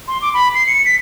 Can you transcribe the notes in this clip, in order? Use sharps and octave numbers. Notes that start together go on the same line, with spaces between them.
C6
D6
B5
C7
C#7
B6